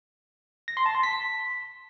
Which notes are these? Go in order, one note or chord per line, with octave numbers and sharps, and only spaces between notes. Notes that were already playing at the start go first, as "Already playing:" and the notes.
A#6
C6
A5
C6
B6